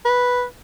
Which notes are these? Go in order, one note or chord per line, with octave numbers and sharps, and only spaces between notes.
B4